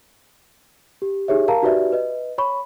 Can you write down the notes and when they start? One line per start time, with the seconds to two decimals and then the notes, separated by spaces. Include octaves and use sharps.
1.02 G4
1.28 D#4 G4 G#4 C#5 E5
1.48 A#4 F5 A5 A#5
1.62 D#4 F#4 G4 B4 D5 E5
1.93 B4 D#5
2.38 C#5 B5 C#6